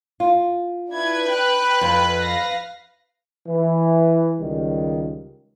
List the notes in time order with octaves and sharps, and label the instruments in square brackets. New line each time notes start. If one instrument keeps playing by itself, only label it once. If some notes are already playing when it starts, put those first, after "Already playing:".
[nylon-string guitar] F4
[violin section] D4 E4 G#6 [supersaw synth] B4
[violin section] G5 F#6
[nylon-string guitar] F2
[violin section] F5 A#6
[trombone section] E3
C#2 D#3 G3